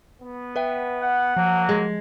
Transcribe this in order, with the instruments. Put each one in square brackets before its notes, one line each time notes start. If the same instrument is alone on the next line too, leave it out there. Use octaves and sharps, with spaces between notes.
[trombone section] B3
[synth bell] B4 E5 G5
[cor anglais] F#5
[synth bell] F3 [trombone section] F#3 A#3
[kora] G#3